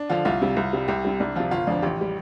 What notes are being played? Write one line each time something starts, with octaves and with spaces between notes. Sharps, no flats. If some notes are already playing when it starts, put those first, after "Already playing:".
Already playing: D4
D3 F3 F4
C2 F4
C3 G3
C2
C3 G3
C2 G4
C3 G3
C2 D4
C3 F3 F4
G1 F4
F2 D3 F3 D4
A1 G4
G3